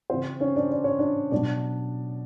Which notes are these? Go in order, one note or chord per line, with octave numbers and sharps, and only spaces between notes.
C#3 E3 C4 C5
C#4 C#5
D4 D5
D5
C#5
D4 D5
B2 F#3 D4 D5